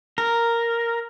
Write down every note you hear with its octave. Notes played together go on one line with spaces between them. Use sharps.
A#4